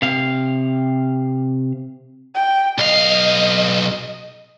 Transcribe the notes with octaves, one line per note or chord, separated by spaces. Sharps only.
C3 F5
G5
B1 D#5 F5